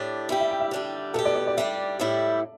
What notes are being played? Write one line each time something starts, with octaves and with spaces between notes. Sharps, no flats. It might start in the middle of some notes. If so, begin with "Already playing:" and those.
Already playing: A2 D4 G4
G3 E4 G4 G5
E5
G5
E5
D3 G3 D4 G4
B2 B3 G4 A4
D5
D5
D5
G3 D4 G4 E5
A2 G3 E4 G4